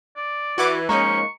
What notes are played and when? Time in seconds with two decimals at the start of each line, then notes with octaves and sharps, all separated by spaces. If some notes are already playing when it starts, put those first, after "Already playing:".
0.16 D5
0.58 E3 F#4 F#5 D6
0.89 F3 G#3 A#3 C#4 D#4 A#5 C#6